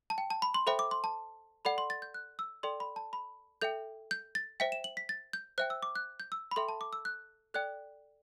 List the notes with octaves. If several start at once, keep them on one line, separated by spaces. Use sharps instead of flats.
A5
G5
A5
B5
C6
A4 C5 E5 G5 B5
D6
C6
A5
A4 D5 F#5 B5
C6
A6
G6
F#6
E6
A4 D5 G5 C6
B5
A5
B5
A4 E5 G5 G6
G6
A6
C5 E5 G5 B6
E7
F#7
B6
A6
G6
C5 E5 G5 F#6
E6
D6
F#6
G6
E6
B5
A4 E5 G5 C6
A5
D6
E6
F#6
A4 D5 G5 F#6